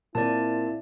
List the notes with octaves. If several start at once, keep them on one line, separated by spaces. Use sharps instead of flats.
A#2 C4 E4 D5 A5